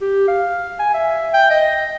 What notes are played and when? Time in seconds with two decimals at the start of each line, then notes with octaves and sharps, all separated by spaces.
0.01 G4
0.28 F5
0.79 G#5
0.94 E5
1.34 G5
1.50 D#5